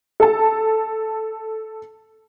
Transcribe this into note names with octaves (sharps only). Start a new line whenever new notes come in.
A4 A5